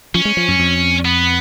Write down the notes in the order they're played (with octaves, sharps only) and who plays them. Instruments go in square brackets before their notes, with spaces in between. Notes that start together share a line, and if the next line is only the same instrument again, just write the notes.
[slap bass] F3 [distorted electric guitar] C#4
[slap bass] G#3
F3
F#2
F2
[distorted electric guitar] B3